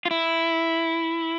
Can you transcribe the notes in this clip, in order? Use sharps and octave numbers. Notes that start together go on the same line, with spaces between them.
F4
E4